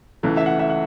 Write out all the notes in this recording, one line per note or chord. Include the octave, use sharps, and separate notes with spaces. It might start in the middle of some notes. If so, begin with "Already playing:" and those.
C#2 C#3 E3 A3
E5
F#5
E5
F#5